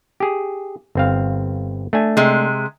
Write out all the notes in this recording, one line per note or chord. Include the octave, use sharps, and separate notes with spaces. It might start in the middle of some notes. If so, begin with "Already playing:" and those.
G4 G#4
G1 C4 F5
A3 D4 G#5
C3 G#3